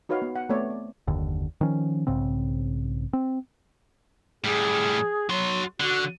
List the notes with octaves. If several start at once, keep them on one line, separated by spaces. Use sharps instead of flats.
D#4 F#4 B4 C#5 F5
B3
F#5
A3 B3 C4 C#5 D5
D5
F#1 D#2 D3
D#3 F3 C#4
B1 G#2 C#3 C4
C4
A2 G3 G#4
F#3 F#4 C6
D3 F#4